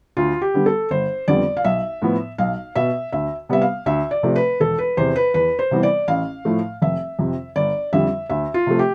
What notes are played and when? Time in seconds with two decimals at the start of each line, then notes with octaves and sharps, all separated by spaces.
0.17 D2 F4
0.42 G4
0.54 D3 G3 B3
0.66 A4
0.91 G1 C5
1.28 F2 D3 G3 B3 D5
1.57 F5
1.64 B1 E5
2.02 A2 F3 B3
2.38 B1 F5
2.75 B2 B3 E5
3.12 D2 E5
3.49 C3 G3 B3 E5
3.62 F5
3.86 D2 E5
4.11 D5
4.23 C3 F3 A3
4.36 B4
4.60 E1 A4
4.79 B4
4.97 E2 C3 C5
5.16 B4
5.34 E2 B4
5.59 C5
5.71 C3 E3 G3 B3
5.83 D5
6.08 A1 F5
6.45 A2 F3 A3
6.82 F1 E5
7.19 F2 C3
7.56 G1 D5
7.93 F2 D3 G3 E5
8.30 D2 E5
8.54 F4
8.67 C3 F3 A3
8.79 G4